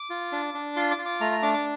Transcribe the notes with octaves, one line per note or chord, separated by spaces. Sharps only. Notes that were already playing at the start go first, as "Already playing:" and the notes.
Already playing: D6
F4
D4
D4
F4 C6
D6
F4
D6
A3 A#5
A#5
D4 D6
D6